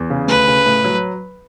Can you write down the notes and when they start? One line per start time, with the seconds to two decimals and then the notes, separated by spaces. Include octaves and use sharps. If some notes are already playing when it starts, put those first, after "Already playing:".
Already playing: E2
0.10 C#3
0.28 D2 B4
0.47 C#3
0.66 A2
0.84 F#3